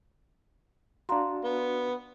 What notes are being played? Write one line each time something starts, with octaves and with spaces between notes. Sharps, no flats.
D4 F#4 F5 A#5 C6
B3